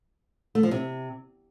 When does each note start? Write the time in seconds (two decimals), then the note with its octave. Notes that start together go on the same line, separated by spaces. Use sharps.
0.55 A3
0.63 F3
0.71 C3